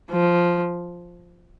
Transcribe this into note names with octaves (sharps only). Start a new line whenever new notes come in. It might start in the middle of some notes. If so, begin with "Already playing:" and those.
F3